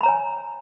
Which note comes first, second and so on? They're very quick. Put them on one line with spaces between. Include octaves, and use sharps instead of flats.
B5 A#5 C#5 G#5